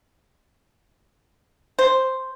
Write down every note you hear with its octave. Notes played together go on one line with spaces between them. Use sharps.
C5